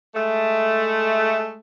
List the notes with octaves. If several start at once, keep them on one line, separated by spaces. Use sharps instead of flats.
G#3 A3